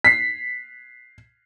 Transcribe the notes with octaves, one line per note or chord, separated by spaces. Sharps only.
B6 C7